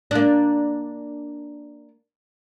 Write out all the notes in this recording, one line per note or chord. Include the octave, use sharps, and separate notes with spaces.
A#3 D4